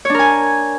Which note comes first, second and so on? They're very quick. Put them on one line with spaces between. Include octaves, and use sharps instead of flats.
C#5 D4 A#4 G#5